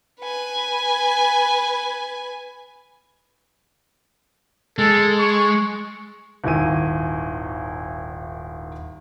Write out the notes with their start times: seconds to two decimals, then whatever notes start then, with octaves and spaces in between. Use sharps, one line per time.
0.21 B4 G#5
4.78 G#3 A4
5.18 C#6
6.44 D#1 G#1 D#3 E4 G#5 D#7